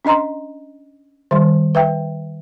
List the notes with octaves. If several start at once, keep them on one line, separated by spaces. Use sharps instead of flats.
C#4 D4 D#5 A#5 C6
D#3 G3 C6
B4 E5 G5